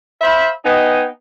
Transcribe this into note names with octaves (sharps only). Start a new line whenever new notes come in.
C5 E5 F5 B5
B3 D#4 D#5 G5 G#5